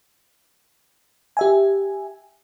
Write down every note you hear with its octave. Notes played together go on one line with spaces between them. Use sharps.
G4 E5 G#5